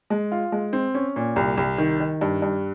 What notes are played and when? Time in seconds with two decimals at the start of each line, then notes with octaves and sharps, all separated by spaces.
0.10 G#3
0.32 F4
0.52 G#3
0.73 C4
0.95 C#4
1.16 A#2
1.36 C2
1.57 C2
1.78 D#3
2.00 D#3
2.21 G2
2.42 G2